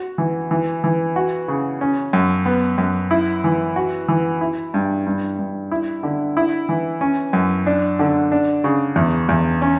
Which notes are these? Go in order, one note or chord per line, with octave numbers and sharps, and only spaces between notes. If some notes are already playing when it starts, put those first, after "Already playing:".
Already playing: F#4
E3
E3
E3
F#4
C#3
C#4
F#2
B3
F#2
E4
E3
F#4
E3
E4
G2
G2
G2
E4
D3
E4
E3
C#4
F#2
D4
D3
D4
C#3
E2
E2
C#4